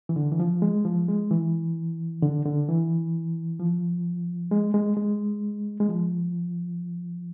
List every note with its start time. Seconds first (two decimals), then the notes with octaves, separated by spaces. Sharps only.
0.09 E3
0.16 D3
0.32 E3
0.40 F3
0.62 G#3
0.85 F3
1.08 G#3
1.31 E3
2.23 D3
2.45 D3
2.69 E3
3.60 F3
4.51 G#3
4.74 G#3
4.97 G#3
5.80 G#3
5.89 F3